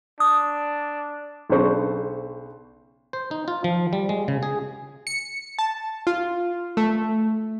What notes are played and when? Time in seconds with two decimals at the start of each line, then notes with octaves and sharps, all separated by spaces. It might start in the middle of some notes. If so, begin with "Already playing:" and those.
0.20 D4 D#6
1.49 B1 C#3 D4 C5 C#6
3.13 C5
3.31 D#4
3.48 F4
3.64 F3
3.93 G3
4.09 G#3
4.28 C#3
4.43 G#4
5.07 C#7
5.58 A5
6.07 F4
6.77 A3